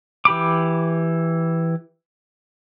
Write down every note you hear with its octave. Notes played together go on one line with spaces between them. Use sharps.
E3 G4 B5 D6